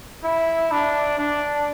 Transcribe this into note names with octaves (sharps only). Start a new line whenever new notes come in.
E4
D4
D4